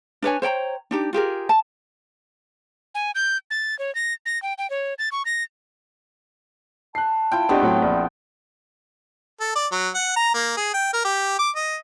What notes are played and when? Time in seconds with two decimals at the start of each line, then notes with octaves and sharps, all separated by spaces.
0.22 D4 B4 C#5 G#5
0.42 C5 C#5 G5 A#5
0.91 D4 D#4 G4
1.13 F4 G4 G#4 A#4
1.49 A5
2.95 G#5
3.15 G6
3.51 A6
3.79 C#5
3.95 A#6
4.26 A#6
4.42 G5
4.58 G5
4.70 C#5
4.99 A6
5.12 C#6
5.26 A#6
6.95 A5 F#6 C7
7.31 E4 F4 G5
7.49 A3 B3 C4 D4 G4 D#5
7.61 A2 F#3 G5
7.82 A#1 D5
9.40 A4
9.55 D5
9.72 F#3
9.95 F#5
10.16 A#5
10.34 A#3
10.57 G#4
10.74 G5
10.93 A#4
11.05 G4
11.39 D6
11.56 D#5